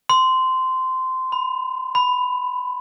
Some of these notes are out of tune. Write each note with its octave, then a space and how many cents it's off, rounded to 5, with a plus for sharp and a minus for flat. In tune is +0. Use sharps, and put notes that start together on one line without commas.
C6 -15
B5 +25
B5 +10